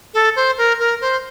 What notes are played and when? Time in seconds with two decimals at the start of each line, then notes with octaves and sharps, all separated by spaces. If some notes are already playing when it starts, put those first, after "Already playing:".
0.14 A4
0.36 C5
0.58 A#4
0.80 A#4
1.01 C5